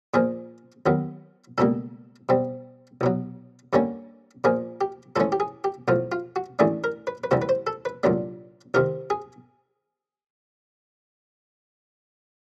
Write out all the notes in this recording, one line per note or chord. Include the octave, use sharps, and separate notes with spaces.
A#2 F3 A#3 G#4
D#2 D#3 F#3 B3
C#2 B2 G3 A#3 A4
B2 G3 C4
C2 B2 F#3
G2 D3 G3 A#3 C#4
A#2 F3 A#3 G#4
G4
G#2 E3 A3 C#4 A4
G4
G#4
G4
B1 A2 F3 F4
F4
F#4
A1 A2 E3 A3 D4 G#4
A#4
B4
B4
D2 C3 E3 G3 C5
B4
C5
A4
B4
C2 A#2 F#3 A3 D4
C2 C3 D#3 A#4
G#4